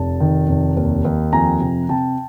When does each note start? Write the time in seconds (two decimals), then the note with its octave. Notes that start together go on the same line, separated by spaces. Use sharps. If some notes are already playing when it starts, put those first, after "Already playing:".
Already playing: F1 A5
0.20 D#3
0.49 F1
0.77 D#2
1.05 D#2
1.33 F2 G#5 A#5
1.61 C3
1.89 C3 G5 A5